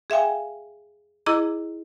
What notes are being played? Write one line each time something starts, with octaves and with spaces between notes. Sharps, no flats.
G#4 E5 F5 G5 G#5
E4 G#4 D#5 A#5 D6